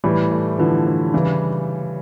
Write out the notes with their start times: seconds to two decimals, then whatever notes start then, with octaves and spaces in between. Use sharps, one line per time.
0.04 A2 E3 G3
0.31 A3
0.58 D3 E3 F3
0.86 D4
1.13 C#3 E3 G3